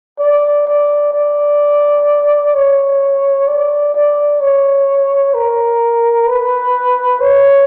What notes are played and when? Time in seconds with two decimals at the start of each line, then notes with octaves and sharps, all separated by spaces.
0.19 D5
0.67 D5
1.13 D5
2.54 C#5
3.47 D5
3.94 D5
4.40 C#5
5.34 A#4
6.27 B4
7.21 C#5